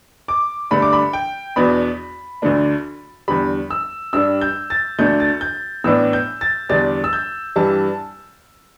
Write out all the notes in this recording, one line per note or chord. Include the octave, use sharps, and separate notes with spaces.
D6
G2 D3 A3 D4 B5
D6
B5
G5
E2 B2 B3 D4 B5
D2 D3 A3 D4
E2 D3 G3 B5
E6
G2 G3 D4 E6
G6
A6
D2 D3 A3 D4 G6
A6
G6
A2 E3 B3 D4 E6
G6
A6
E2 D3 G3 D4 A6
E6
G6
G2 E3 G3 A5